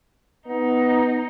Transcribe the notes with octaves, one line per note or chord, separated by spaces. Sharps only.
B3 D#4